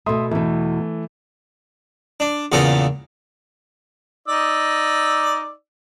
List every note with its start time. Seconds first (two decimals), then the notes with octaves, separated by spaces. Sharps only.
0.06 B2 A3 E5 C6 D#6
0.31 E2 B2 E3 A3
2.20 D4
2.52 E2 A#2 C#3 B3 A4 A#5
4.28 D#4 D5 E6